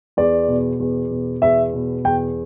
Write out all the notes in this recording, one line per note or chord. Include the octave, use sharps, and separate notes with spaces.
E2 D5
B2
E2
B2
E2 E5
B2
E2 G5